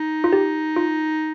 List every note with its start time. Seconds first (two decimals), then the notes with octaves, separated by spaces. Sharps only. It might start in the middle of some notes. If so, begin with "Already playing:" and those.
Already playing: D#4
0.24 F4
0.33 G4
0.76 F4